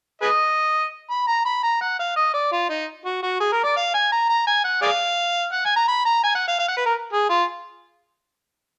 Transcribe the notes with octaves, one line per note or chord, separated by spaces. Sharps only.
G#4 B4 D#5
B5
A#5
B5
A#5
F#5
F5
D#5
D5
F4
D#4
F#4
F#4
G#4
A#4
D5
F5
G#5
A#5
A#5
G#5
F#5
G#4 D5 F5
F#5
G#5
A#5
B5
A#5
G#5
F#5
F5
F5
F#5
B4
A#4
G#4
F4